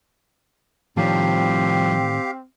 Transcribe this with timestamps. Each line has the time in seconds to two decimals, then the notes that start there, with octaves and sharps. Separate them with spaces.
0.97 A2 D#3 F3 G3 C4 D4 G4 F5